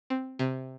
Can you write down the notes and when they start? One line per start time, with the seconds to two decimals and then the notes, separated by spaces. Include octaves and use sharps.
0.10 C4
0.39 C3